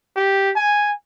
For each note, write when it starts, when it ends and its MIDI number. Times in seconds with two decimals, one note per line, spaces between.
0.16 0.51 67
0.56 0.90 80